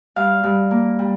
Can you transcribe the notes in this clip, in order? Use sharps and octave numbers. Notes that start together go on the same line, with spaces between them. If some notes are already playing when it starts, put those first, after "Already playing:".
G2 F5
G2
A#3
G3